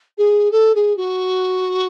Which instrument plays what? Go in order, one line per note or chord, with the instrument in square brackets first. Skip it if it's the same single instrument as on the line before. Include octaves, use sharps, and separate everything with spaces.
[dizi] G#4
A4
G#4
F#4